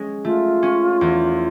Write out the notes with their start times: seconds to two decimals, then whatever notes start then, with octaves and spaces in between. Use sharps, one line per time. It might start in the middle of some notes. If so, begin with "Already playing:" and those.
Already playing: G#3 C#4
0.25 A3 F4
0.63 C#4
1.01 E2